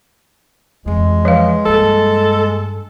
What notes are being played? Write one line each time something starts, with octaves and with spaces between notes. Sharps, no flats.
F2 E3 G#3
F3 B4 F5
G2 A#3 A4